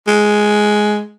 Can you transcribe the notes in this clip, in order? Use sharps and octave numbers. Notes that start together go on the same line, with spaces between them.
G#3